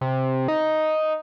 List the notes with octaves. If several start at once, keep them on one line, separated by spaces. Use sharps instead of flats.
C3
D#4